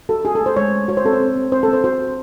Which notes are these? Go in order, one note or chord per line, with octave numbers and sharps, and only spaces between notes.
F#4 A4
F#4 G#4
A4
A3 C5
G#3 C#5
G#3
F#4 C#5
C5
C4 A4
C5
C4
C4
C4 C5
A4
C4
C5
F#4 C5
F#4